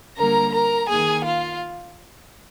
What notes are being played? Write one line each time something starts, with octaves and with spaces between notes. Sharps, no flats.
D3 G3 A#3 A#4 A#5
A#4 A#5
D#3 A#3 G#4 G#5
F4 F5